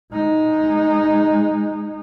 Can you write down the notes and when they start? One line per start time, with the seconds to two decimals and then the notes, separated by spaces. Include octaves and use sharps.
0.12 G#3 D#4